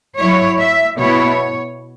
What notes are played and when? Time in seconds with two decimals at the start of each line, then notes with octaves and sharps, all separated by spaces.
0.18 F#3 E4 C#5
0.59 E5
0.99 B2 B3 E4 C#5